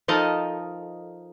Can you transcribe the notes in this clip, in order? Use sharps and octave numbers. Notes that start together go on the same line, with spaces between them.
F3 D#4 A4 A#4 D#5